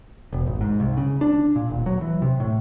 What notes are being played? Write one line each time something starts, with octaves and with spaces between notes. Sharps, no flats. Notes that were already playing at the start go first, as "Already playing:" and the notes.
E1
G#1
G#2
C2
C#3
D4
A#2
D#1
F#3
E3
C3
A2